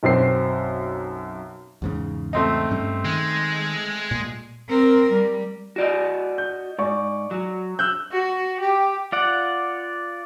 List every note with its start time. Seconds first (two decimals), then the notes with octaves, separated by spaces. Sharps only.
0.03 B1 F#2 C4 C7
1.82 E2 G#2 C#3
2.33 A3 C4 D#4
2.71 G2 G3 C#4
3.05 D#3 G#3
4.11 A#2
4.69 C4 A#4
5.13 G3
5.76 F#4 D5 D#5
6.38 G6
6.79 G#2 D5 C#6
7.31 F#3
7.79 E6 F#6 G6
8.12 F#4
8.60 G4
9.12 F4 D5 F#5